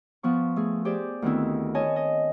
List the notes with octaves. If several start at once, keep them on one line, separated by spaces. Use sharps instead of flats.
F3 B3 C#6
A3 G#4
G4 G#4 C5 D5
D2 D#3 B3 C4 E4
C#5 D#5 G#5 A5
D#5